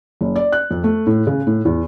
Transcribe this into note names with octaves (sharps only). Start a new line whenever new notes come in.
F#1
D5
F#6
F2
A3
A2
C#3
A2
E2